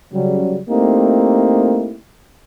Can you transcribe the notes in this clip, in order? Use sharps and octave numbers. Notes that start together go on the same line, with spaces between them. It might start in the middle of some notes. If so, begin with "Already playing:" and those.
C#3 F#3 G3
A3 A#3 C4 D#4 E4 G4